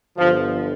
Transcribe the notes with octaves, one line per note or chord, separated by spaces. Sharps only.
G1 G2 D3 F3